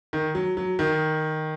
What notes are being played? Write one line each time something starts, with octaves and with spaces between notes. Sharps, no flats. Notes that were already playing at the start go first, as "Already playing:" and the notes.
D#3
F#3
F#3
D#3